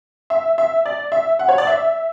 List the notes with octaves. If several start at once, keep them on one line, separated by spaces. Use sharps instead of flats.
E5
E5
D5
E5
F#5
C#5
D5
E5